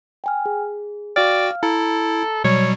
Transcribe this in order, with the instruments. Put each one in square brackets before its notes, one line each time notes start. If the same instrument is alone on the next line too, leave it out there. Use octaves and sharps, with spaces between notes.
[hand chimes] G5 G#5 F6
G#4
[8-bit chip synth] F#4 G5 [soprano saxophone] D5 [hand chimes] F5 F6
[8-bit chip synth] E4 [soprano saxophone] A4 [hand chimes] A#5
[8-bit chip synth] B2 F#3 G3 [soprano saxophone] C#5